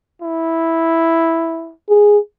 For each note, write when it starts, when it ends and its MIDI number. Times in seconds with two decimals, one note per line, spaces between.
0.22 1.73 64
1.90 2.19 68